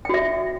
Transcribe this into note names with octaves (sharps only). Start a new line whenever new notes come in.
F#4 E5 G5